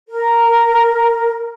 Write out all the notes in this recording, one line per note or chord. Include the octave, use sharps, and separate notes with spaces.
A#4